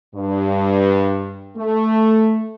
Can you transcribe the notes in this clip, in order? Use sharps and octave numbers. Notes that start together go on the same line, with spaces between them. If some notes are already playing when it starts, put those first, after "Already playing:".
G2
A3